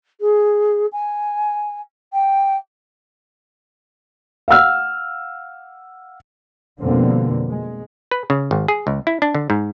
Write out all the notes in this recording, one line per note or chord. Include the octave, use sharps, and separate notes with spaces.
G#4
G#5
G5
F5 F#5 E6 F6
F2 B2 D3 G3 A#3 C4
G#3
B4
C#3
G#1
G#4
C#2
E4
D4
D3
G#2